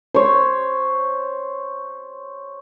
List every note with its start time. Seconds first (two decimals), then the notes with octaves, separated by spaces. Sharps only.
0.14 C5 C#5